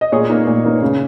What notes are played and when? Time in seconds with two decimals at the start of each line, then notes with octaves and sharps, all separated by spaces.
0.01 D#5
0.12 A#2 G#4 C#5
0.29 A#3 D#4
0.47 A#2
0.65 A#3 D#4
0.82 C#3